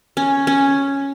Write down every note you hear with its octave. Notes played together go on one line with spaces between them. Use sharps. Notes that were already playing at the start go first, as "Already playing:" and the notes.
C#4
C#4